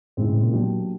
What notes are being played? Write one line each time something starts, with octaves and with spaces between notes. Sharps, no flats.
G#2 C#3 E3 G#3 C4
A2
A#2
B2 F#3 A#3 D4 G4